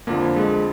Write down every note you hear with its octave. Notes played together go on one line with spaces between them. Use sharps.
F2 D3 F3 A#3
G#3